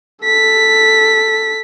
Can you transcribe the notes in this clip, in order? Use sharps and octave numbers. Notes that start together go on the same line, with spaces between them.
A4 B6